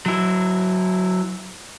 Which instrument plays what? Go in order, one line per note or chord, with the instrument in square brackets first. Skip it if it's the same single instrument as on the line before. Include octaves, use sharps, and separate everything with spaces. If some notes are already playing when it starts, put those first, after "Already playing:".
[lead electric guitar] F#3 E4